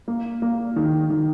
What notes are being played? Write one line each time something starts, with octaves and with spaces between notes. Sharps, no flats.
A#3
A#3
D#3
D#3